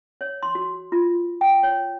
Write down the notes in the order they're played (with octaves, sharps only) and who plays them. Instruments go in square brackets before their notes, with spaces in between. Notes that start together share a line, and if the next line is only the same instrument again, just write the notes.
[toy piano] C#5
C6
F#4
F4
G5
C#5